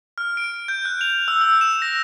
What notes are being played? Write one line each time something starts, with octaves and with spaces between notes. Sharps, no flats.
F6
D7
G6
F#6
F7
E6
E6
E7
A#6